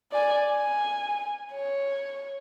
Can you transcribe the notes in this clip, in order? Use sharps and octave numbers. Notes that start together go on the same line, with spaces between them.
D5 G#5
G#5
C#5